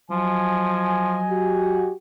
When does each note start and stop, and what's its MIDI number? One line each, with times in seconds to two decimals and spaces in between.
0.10 1.26 53
0.10 1.91 54
0.10 1.91 75
0.10 1.91 80
1.29 1.92 66
1.29 1.92 67